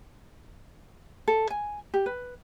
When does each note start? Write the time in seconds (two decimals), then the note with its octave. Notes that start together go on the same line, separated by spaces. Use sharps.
1.28 A4
1.50 G#5
1.94 G4
2.06 B4